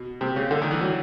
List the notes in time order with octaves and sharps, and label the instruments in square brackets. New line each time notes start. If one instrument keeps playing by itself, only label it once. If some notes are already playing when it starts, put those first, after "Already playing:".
Already playing: [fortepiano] B2
C3
C#3
D3
D#3
E3
F#3